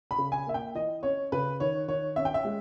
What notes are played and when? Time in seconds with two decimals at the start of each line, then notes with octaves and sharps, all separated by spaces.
0.11 B5
0.18 C#3
0.32 G#5
0.46 A#3 E5
0.54 G5
0.75 E3 D#5
1.03 C#4 C#5
1.32 C#3 B4
1.60 D#3 C#5
1.88 D#3 C#5
2.16 C#4 E5
2.25 G5
2.34 E5
2.45 G#3